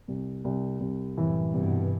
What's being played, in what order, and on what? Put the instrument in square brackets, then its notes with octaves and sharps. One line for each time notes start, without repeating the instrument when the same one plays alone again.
[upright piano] C2
C2
C2
[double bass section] F#2 A2 [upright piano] E3
[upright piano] C2 [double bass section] G2 B2